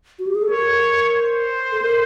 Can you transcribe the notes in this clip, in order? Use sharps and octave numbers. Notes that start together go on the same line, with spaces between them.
F#4
G4
G#4
A4
A#4 C#5
C5
A4
A#4